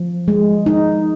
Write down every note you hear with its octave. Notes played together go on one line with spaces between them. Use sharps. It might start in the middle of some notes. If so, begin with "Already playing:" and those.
Already playing: F3
G#3
D#4